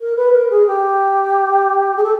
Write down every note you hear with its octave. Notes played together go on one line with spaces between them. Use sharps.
A#4
B4
A#4
G#4
G4
G#4
A4